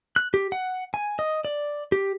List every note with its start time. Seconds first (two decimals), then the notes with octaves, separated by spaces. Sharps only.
0.16 F#6
0.34 G4
0.52 F#5
0.94 G#5
1.19 D#5
1.45 D5
1.92 G4